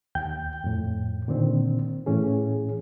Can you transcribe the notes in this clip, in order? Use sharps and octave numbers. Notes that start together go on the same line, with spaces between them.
D#2 G5 G6
F2 A2
A#2 D3 D#3 C4
A2 E3 C#4 G#4